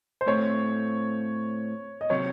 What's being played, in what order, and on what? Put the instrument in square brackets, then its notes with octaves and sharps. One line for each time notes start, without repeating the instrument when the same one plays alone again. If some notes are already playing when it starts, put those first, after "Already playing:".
[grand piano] C5
[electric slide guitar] A2 A3 C4 [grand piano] C#5
[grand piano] D#5
[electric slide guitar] C3 F#3 [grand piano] C#5